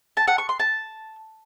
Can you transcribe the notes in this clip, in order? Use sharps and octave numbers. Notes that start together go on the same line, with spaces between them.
A5
F#5
C#6
C6
A5